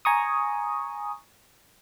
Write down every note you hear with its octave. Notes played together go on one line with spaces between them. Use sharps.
G#5 A#5 C#6 D#6